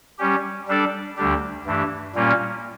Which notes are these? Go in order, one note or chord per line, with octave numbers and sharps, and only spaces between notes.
G3 C#4 G4
G3 D4 A4 D5
D2 D3 G3 D4 G4
G2 E3 A3 D4 G4
A#2 G3 A#3 C#4 F4